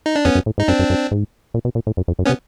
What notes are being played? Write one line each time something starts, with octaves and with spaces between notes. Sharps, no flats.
D#4
D4
F2 B3 C#4
F#2
A2
G#2 D#4
F#2 C4 D4
F#2
F#2
G#2
A#2
B2
A#2
A2
F#2
F2
F#2
B3 C#4
C3